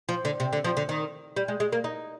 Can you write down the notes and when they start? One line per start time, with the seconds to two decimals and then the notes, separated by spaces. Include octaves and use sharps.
0.09 F3
0.25 D3
0.40 C3
0.53 D3
0.64 F3
0.77 D3
0.89 D#3
1.36 G3
1.48 G#3
1.60 G#3
1.72 A#3
1.84 D#4